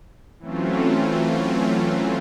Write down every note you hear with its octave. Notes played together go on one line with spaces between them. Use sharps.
E3 F#3 A3 C4 C#4 F4